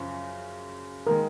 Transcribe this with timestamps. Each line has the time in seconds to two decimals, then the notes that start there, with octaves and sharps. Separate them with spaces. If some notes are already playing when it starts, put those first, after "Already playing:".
Already playing: F#2 C#3 F3
1.07 D#3 G#3 A#4